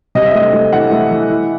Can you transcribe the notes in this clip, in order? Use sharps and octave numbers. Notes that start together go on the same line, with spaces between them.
C3 D#5
E5
A3 D#5
A3
E3 F#5
A3
E3
E3